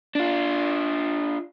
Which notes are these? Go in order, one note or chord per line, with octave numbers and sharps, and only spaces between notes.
D4 F4